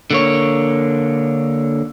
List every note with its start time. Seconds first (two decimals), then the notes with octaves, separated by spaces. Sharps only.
0.11 D3 A#3 C#5